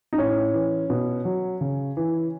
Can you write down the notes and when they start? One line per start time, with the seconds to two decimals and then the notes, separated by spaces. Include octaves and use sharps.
0.13 D#4
0.18 A2 C#4
0.54 E3
0.90 B2
1.25 F#3
1.61 C#3
1.97 E3